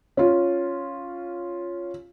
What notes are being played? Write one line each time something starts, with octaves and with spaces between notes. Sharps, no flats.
C#4 F4